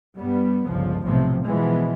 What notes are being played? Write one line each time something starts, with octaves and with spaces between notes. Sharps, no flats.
G2 G3 B3
G1 C#2 F3
B1 A2 C3 F3
B2 E3 F3 G#3 B3